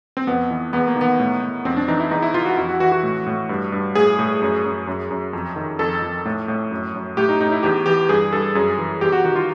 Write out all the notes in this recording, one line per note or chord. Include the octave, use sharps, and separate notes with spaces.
C4
F2 B3
E3
E2 B3
A#3
D#3
B3
A2
A2
F2 C4
D4
E3 D#4
E4
E2 D#4
E4
E3 F4
F#4
F2 E4
F#4
E3 F#4
F#4
A2
A2
G2
G2
A2 G#4
A2
F#2
F#2
F#2
F#2
F2
D#3
F2 A4
F2
A2
A2
F#2
F#2
A2 G4
D#4
A2 D#4
E4
E2 G4
E3 G4
G2 G#4
G2 A4
F#2 G#4
E3
E2 G4
F#4
D#3 F#4
F4